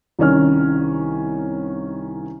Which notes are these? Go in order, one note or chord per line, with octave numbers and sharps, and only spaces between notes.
C2 D#3 C#4 F6